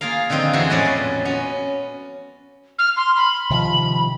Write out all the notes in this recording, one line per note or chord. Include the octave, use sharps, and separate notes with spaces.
A#3 F4 G#4 A#4 F5
D3 D#3 F3 C4 D#4
F2 E3 B3 F#4 G#4 C6
F2 A2 G#3 C#4 D5 F#5
A#2
B3 C#4 F#4
F6
C6
B5
C3 D#3 F3 B5